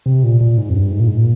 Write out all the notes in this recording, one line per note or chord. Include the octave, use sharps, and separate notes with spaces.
C3
A#2
A#2
G#2
F2
G2
G#2
A#2
G#2
A#2